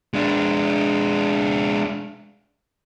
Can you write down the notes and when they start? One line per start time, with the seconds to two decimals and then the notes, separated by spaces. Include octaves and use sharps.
0.14 G#3 D4